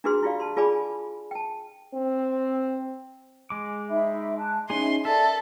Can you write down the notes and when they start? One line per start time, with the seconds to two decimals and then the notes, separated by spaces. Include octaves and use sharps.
0.04 D4 E4 F#4 G#4 B4 C6
0.23 E4 F4 G4 D5 F5
0.40 A5 C6
0.57 F4 G#4 D5 G#5 B5 D6
1.31 G5 A5
1.94 C4
3.50 G#3 D6
3.89 D#4 E5 B5
4.38 A5 F#6
4.70 C#4 D#4 E4 G#4 E5 G#5 C6
5.05 A4 A#4 D5 E5